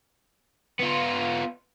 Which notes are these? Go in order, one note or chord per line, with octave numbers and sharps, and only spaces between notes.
B3 F4